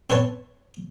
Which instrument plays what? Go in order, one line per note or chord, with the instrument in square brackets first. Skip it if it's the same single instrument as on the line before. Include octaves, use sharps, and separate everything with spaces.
[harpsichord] C4 B4 C#5 A5